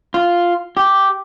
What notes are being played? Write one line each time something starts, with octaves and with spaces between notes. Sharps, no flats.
F4
G4